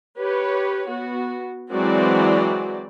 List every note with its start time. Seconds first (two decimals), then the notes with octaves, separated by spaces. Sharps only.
0.19 G4 B4 C#5
0.90 B3 F#4
1.73 E3 F#3 G#3 C4 F#4 D5